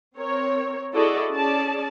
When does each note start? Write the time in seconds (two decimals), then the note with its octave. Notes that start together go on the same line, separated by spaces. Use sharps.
0.18 C4 A#4 C#5
0.95 E4 F#4 G#4 A4 D5 D#5
1.31 C#4 G#4 D5 A5